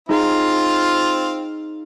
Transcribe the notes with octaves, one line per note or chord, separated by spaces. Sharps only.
C4 D#4 F4 G#4 F5